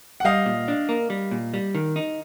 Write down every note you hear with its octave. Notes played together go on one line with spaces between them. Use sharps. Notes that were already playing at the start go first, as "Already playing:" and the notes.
F#5
G3 D#5 F5
A#2
D4
A#3
G3
A#2
G3
D#3
D#4